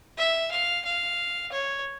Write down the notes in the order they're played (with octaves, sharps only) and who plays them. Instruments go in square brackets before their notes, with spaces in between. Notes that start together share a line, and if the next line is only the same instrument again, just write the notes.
[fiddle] E5
F5
F5
C#5